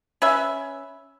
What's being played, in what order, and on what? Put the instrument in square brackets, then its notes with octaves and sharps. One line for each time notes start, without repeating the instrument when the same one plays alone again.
[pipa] C#4 B4 E5